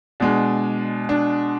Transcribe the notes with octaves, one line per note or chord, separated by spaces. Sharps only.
B2 G#3 D4
D4